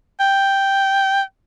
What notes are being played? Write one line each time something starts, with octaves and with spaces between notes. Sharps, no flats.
G5